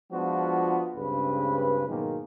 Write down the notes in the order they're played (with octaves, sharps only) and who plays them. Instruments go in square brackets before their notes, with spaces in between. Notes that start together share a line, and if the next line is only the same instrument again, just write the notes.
[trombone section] F3 G#3 B3 D4 F4 F#4
C#2 G2 C#3 C4 B4
G#2 B2 D#3 F#3 G#3 A#3